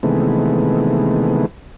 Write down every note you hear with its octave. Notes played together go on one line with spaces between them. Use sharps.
C3 D#3 E3 G#3 A3 B3